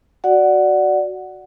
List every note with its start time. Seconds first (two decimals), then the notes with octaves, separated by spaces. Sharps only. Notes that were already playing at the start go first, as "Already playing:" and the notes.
0.24 F#4 D5 F#5